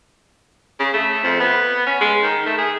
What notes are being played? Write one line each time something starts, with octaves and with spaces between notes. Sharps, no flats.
C#3
A3
F2
B3
C#4
G#3
D#3
A3
G#4